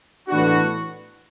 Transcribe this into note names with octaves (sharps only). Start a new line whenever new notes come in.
A2 E3 B3 D4 F#4